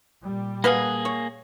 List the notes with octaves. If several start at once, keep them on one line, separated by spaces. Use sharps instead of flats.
A#2 G3
A#3 G#4 B4 F5 F#5
C#5